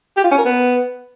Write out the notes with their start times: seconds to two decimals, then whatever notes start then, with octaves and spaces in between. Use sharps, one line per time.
0.17 G4
0.24 F4
0.31 C#4
0.38 A#4
0.45 B3